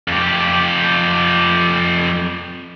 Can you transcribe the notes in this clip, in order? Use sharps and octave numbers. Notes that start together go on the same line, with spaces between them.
F2 G4